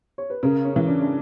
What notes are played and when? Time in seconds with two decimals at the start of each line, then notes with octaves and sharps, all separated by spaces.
0.18 C#5
0.30 B4
0.43 C#3 A#4
0.65 C#4
0.76 E3
0.87 D4
1.01 D4